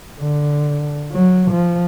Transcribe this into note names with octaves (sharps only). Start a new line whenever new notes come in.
D3
F#3
F3